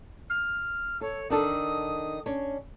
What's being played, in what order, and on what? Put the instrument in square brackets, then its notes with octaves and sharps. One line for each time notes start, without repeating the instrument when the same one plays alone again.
[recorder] F6
[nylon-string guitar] A4 [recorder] C#5
[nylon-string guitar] D#3 D4 A4 [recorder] D#6
[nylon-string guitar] C#4 D4 C#5